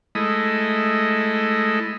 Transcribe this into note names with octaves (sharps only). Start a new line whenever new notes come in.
G#3 A3 E4 D#5